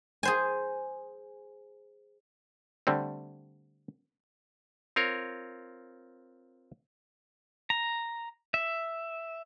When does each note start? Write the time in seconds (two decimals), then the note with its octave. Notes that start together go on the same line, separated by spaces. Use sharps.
0.23 G#4 C5 G#5
2.87 D3 G3 A3 C4
4.96 C4 F4 A#4 C#5
7.70 A#5
8.54 E5